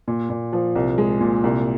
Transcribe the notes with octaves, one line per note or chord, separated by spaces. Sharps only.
A#2
A#2
F3
C2
G#3
A#2
C2